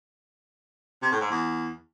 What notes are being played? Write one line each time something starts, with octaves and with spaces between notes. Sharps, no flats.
C3
A2
G#2
E2